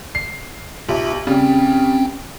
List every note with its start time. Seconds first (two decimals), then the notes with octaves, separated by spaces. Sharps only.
0.15 C7
0.89 B1 F4 G4 E5
1.27 C#3 G3 C4 C#4 G5